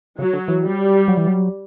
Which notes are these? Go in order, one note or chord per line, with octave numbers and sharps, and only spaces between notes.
C#3 F#3
D3
E3
G3
F#3
E3
F#3